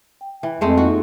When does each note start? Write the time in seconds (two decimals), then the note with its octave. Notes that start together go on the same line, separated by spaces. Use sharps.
0.21 G5
0.43 E3
0.61 F2 G#3 A3 C5
0.77 A#3 D#4 F4 F#4